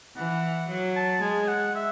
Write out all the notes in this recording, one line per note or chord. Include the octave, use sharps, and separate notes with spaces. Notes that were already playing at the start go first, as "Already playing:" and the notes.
E3 F#5
F#3
A5
G#3 G#5
F#5
E5